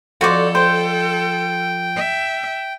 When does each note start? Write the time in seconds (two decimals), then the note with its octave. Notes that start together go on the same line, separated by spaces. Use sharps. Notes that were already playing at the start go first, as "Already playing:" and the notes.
0.21 F2 F#4 A4 C5 D5
0.55 C5 G5
1.96 E5